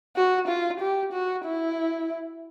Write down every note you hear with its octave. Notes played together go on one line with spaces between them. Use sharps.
F#4
F4
G4
F#4
E4